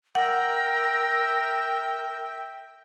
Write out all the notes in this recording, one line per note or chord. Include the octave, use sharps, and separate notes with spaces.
A#4 E5 F#5 G5